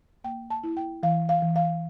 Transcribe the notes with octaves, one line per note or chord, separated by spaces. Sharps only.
A#3 G5
A5
E4
G5
E3 F5
F5
E3
F5